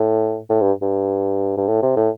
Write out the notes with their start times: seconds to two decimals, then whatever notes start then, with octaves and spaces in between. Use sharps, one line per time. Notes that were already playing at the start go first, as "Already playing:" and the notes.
Already playing: A2
0.50 A2
0.61 G2
0.82 G2
1.57 G2
1.67 A2
1.82 C3
1.96 A2